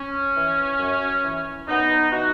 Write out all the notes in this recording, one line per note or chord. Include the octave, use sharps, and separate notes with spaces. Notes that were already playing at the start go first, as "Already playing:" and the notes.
Already playing: C#4
E3
F#2
E3
F#2 B3 D#4
E3 D#4 F#4